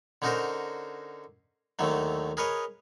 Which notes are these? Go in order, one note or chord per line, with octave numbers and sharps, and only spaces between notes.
D3 C#4 D#4 F#4 A#4 C5
D#2 D3 D#3 F#3 A3
G#4 A#4 B4 C#5 D#5